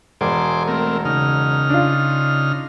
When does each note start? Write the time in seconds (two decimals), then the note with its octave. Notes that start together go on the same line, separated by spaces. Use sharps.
0.21 E1 G#4 C5 D6
0.68 A3 C4 A#4
1.05 C#3 D#4 F6
1.70 D4 F4